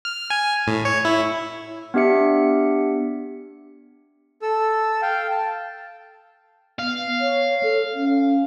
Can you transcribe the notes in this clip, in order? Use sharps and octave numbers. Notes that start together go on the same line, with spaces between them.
F6
G#5
A2
C#5
E4
B3 D4 G4 E5 C#7
A4 E6
F5 G5
A5
B3 F5
C#5
A4
C#4